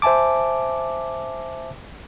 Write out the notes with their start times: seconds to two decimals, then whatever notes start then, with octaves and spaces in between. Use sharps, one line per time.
0.02 C5 E5 G#5 A5 D6